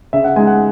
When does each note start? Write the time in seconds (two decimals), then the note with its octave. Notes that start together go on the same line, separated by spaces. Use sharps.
0.13 C#3 E5
0.24 F#5
0.36 G#3 D#4 G#5
0.47 F#5